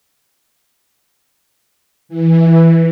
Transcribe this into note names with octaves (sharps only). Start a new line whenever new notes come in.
E3